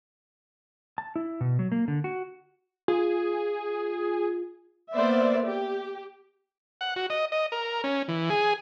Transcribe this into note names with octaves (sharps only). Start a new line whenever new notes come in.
A5
E4
B2
F#3
A#3
D3
F#4
F4 G#4
A#3 B3 C5 D5 E5
G4
F#5
F#4
D#5
D#5
A#4
C#4
E3
G#4